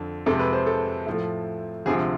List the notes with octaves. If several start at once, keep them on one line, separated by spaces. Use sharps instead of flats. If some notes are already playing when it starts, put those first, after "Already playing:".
Already playing: F2 D3
F2 C3 G#3 A4
B4
C5
A4
A2 F3 A3
D2 C3 F3 G#4